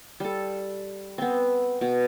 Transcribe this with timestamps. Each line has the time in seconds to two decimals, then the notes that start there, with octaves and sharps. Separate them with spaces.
0.20 G3 A4
1.18 B3 C4
1.81 B2